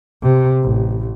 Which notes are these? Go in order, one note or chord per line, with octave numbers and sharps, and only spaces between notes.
C3
A1